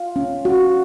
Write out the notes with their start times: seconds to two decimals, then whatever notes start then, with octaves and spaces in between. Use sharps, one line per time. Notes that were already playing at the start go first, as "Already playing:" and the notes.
Already playing: F4
0.16 C#4
0.45 F#4